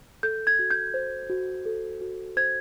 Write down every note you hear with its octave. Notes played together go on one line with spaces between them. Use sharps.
A4 G6
G#6
F#4
G6
C5
F#4
A4
F#4
C5 G#6